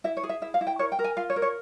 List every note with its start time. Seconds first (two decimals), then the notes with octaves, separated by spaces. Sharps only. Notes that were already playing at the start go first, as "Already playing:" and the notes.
0.04 E4 E5
0.17 C#5
0.23 G#4
0.29 E5
0.42 E4 E5
0.54 F5
0.61 E4
0.67 G5
0.79 A#4 C#5
0.92 G5
0.99 A#4
1.04 G#5
1.17 F4 F5
1.30 C#5
1.36 A#4
1.42 C#5